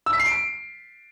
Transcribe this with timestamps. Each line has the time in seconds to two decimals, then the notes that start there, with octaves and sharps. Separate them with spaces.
0.06 E6
0.13 B6
0.19 C7
0.26 D7